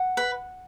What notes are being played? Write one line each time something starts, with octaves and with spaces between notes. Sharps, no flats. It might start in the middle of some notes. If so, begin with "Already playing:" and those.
Already playing: F#5
B4